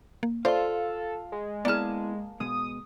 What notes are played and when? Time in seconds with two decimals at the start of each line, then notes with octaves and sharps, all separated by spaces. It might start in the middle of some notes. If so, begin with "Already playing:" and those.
0.23 A#3
0.45 F4 A4 C5 D5 F5 C6
1.32 G#3
1.65 A#3 B3 E4 G#4 D5 A5 F6
2.40 B2 G#3 D#6